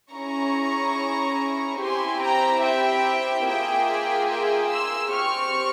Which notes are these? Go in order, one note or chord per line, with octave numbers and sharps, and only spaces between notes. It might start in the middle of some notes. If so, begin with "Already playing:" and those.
C#4 E4 G#4 A#5 C#6
C4 E4 G4 G#5 C6
G5 A#5
E5 G5
A#3 F4 G#4 E5 G5
E5 G5
C6 E6
C4 G4 C#6 F6